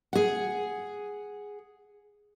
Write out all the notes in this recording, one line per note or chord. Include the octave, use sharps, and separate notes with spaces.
G#4 F#5